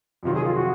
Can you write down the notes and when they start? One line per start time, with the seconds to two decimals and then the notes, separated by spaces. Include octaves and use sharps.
0.23 F2 C3 D#3 F#3 F4
0.34 G#4
0.44 F4
0.55 F#4